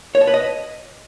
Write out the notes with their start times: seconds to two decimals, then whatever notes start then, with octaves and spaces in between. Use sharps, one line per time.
0.15 C#5
0.21 A5
0.27 B4
0.34 D#5